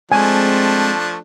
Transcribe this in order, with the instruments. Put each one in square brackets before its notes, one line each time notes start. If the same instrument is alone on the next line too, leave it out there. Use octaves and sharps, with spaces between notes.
[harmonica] F3 A3 D4 [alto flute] G#3 [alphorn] C4 [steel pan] G#5